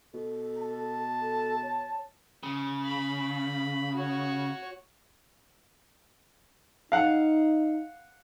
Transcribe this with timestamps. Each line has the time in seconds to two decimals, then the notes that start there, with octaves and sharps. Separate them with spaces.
0.14 B2 A4
0.58 A5
1.22 A4
1.63 C#5
2.43 C#3
2.85 B5
3.95 F#4 C#5
6.92 D#4 F5 F#5